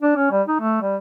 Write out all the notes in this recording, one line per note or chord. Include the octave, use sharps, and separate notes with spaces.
D4
C#4
G3
D#4
A3
G3